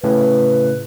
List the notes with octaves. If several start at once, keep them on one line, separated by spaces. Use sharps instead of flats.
A2 C#3 B4